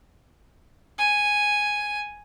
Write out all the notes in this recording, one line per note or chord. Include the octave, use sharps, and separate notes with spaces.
G#5